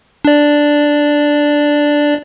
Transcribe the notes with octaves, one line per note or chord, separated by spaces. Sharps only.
D4 D5